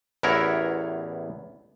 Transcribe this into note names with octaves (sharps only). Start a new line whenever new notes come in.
A1 E2 B3 E4 A#4 C#5